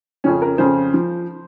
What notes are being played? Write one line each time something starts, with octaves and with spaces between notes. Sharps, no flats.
F2 C#3 F3 C#4
A#4
F2 C#3 F3 C5
F3